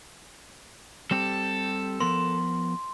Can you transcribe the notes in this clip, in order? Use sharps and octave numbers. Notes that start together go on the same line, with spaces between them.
G3 C4 G4 A4
F3 B3 A#4 C6